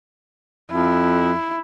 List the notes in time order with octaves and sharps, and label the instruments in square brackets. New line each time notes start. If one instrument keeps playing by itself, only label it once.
[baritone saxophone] F2 [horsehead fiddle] E4